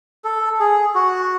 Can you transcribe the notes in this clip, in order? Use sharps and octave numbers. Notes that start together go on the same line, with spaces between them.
A4
G#4
F#4